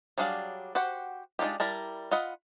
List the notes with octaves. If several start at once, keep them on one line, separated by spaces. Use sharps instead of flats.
F#3 G3 D4 G#4 F5
F#4 G4 C5 F#5
G#3 D4 D#4 F4 G4
G3 E4 A#4 A5
F4 D#5 F#5 B5